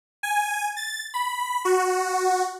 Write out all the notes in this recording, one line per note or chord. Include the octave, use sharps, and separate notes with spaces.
G#5
A6
B5
F#4